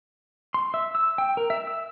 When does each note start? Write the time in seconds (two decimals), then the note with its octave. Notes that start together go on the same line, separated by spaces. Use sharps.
0.54 C6
0.74 E5
0.95 E6
1.18 G5
1.37 A#4
1.50 E5
1.67 E6